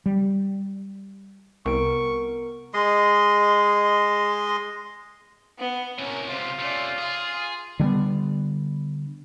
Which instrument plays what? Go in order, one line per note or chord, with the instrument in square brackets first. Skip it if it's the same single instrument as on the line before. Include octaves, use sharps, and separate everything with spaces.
[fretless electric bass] G3
[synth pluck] C2 [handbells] B3 A#4 D7 [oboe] C#6
[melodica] G#3 D#5 C6
[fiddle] B3
[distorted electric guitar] A2 C3 [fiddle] C#4 A#4
[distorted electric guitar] C#2 C3 [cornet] F4 [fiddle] C5
[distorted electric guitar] C3 A3 [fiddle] C#4 D5
[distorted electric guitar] G#4 [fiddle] F5 C6
[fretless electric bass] D3 G3 G#3 B3